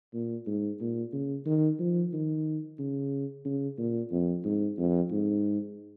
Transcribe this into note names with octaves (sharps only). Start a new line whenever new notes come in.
A#2
G#2
A#2
C#3
D#3
F3
D#3
C#3
C#3
A#2
F2
G#2
F2
G#2